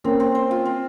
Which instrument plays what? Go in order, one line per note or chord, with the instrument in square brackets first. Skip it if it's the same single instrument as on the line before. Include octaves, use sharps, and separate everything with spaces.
[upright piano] A#3 C#4 [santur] C4
[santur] C4
C5
F4
C4